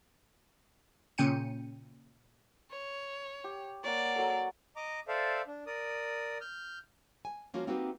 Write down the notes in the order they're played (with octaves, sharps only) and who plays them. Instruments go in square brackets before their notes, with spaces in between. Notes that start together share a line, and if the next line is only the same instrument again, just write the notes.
[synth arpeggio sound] A#2 C#3 C#4 G5 C#7 D#7
[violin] C#5
[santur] G4
[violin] A#3 D5 [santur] C#5 F#5
[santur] F#3 A4
[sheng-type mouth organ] D#5 A#5 D6
A4 C5 D5 E5 F5
D4
A#4 D5 D#6
F6 G6
[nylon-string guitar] G#5
F3 A#3 C#4 F4 F#4
A#3 C4 D#4 F#4 G4 B4